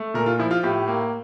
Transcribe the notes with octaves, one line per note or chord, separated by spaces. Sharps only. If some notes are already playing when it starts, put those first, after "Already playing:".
Already playing: A3
A#2 A#4
F4
F3 E4
F4
A2 G4
A#3